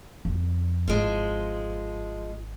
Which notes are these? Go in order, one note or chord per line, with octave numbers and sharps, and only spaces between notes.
F2
G#1 F3 G#3